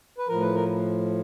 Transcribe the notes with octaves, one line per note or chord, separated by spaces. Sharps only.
B4
A2 F3 A#4
B4
A#4